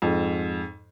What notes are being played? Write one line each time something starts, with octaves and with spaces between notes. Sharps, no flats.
F2 G#2